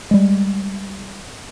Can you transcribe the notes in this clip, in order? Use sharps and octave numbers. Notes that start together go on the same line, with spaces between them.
G3 G#3